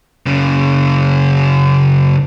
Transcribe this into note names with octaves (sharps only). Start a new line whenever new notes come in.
F#2 C#3